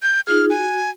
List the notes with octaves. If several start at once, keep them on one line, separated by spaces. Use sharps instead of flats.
G6
D#4 F4 G#4 F6
F#4 G#5